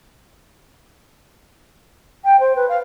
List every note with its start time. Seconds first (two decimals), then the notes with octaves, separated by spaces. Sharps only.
2.24 G5
2.39 C5
2.55 B4
2.68 F5